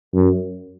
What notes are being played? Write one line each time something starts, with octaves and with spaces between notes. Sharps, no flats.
F#2